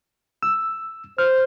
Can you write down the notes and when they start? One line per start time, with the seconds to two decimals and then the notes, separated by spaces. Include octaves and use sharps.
0.43 E6
1.18 C5 F6